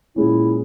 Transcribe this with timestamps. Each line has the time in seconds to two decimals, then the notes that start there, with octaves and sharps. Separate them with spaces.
0.16 A#2 G#3 C#4 E4